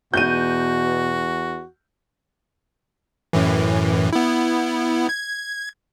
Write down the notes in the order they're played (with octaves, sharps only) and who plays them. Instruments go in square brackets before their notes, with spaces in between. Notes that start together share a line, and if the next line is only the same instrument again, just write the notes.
[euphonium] E2 [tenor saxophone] B2 [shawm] F#4 [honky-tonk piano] G6 D#7
[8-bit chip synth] F#2 A2 E3
B3 E4
G#6